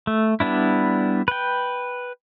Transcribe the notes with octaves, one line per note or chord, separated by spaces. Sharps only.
A3
G3 B3 D4 E4
B4 G5